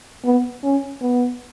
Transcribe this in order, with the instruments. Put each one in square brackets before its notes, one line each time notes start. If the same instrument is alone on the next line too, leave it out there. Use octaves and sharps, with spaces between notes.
[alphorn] B3
C#4
B3